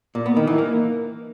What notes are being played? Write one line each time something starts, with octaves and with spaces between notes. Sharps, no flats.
A#2
B3
D#3
E3
A#3